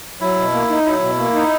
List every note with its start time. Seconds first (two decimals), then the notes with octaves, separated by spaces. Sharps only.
0.21 F#3 E4
0.37 B2
0.53 A#3
0.69 D#4
0.86 F#3 E4
1.02 B2
1.18 A#3
1.35 D#4